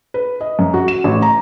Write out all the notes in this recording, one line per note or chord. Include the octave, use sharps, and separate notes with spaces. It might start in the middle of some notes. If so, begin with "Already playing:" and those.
B4
D#5
F#2
F#4
E7
A1
A#5